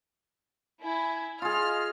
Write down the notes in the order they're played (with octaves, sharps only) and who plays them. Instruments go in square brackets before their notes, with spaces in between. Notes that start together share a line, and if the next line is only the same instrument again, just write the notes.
[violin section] E4 [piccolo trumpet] G#5
[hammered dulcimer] F4 G#4 [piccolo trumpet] D#5 [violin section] F6